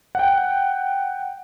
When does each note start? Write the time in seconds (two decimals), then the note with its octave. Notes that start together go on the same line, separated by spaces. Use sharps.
0.15 F#5 G5